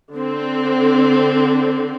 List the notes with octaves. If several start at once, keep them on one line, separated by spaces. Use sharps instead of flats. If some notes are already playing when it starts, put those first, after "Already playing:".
D3 C4